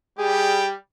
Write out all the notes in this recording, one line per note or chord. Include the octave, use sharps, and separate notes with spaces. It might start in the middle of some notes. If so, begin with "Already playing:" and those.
G3 G4 G#4